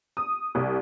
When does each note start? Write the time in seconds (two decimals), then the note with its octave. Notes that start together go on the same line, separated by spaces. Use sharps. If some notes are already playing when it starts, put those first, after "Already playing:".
0.17 D#6
0.55 C2